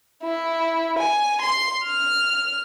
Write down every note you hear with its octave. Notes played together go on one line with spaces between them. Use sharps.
E4
G#5
C6
F6